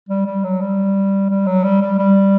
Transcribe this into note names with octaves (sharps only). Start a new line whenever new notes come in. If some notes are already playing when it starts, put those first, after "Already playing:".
G3
G3
F#3
G3
G3
F#3
G3
G3
G3